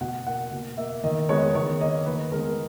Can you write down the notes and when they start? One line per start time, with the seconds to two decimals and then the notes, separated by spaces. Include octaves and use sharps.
0.01 B2 F#5
0.27 A#3 F#5
0.52 B2
0.77 A#3 E5
1.04 D#3 D#5
1.29 G#3 B3 C#5
1.55 D#3 C#5
1.81 A#3 D#5
2.06 D#3 B4
2.32 G#3 A#4
2.35 B3